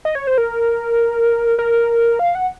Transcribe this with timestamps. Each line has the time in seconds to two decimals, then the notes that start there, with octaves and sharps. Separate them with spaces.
0.05 D#5
0.15 C#5
0.27 C5
0.38 A#4
1.59 A#4
2.19 F5
2.35 F#5